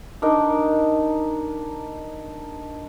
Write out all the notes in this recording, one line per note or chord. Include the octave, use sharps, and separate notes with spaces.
D4 D#4 A#4